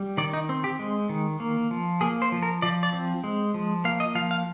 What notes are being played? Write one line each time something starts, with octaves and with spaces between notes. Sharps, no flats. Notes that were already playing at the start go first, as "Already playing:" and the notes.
Already playing: G3
D#3 D5
D#4
C4
G4
G#3
D#3
A#3
F3
A#3 G#4
C5
F3
A#4
F3 D5
D5
C4
G#3
F3
A#3 F5
D#5
F3 F5
F5